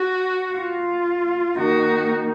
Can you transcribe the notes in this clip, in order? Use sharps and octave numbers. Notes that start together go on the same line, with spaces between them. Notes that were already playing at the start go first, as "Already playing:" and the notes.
Already playing: F#4
F4
D#3 A#3 D#4 F#4